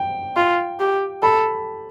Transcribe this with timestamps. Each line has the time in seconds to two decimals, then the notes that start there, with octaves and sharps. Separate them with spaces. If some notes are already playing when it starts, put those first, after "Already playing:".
Already playing: G5
0.36 F4
0.80 G4
1.23 A4 B5